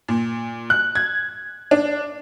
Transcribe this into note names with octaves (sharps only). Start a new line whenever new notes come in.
A#2
F#6
G#6
D4